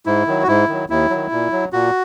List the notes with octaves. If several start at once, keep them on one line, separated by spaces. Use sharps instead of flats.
G#2 E4
D#3 F#3
F#4
G#2 E4
D#3 F#3
D#2 E4
D#3 F#3
A#2
F#3
A#2 F#4